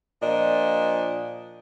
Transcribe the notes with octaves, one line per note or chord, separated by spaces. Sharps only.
A#2 F3 D4 D#5